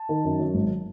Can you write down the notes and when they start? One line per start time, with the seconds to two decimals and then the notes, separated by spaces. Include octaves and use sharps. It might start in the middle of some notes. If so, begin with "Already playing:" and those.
Already playing: A5
0.09 D#3
0.24 F#2
0.39 F#3
0.54 G#1